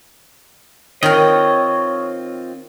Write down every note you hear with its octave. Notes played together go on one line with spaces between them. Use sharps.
D#3 C4 F4 A#4 C#5 D#5